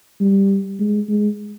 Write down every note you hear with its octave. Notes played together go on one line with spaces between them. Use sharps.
G3
G#3
G#3